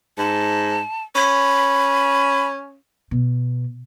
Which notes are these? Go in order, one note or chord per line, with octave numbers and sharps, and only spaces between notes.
G#2 A5
C#4 B5
B2